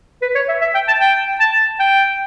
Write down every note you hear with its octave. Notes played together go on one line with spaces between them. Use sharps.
B4
C#5
E5
E5
G5
A5
G5
A5
G5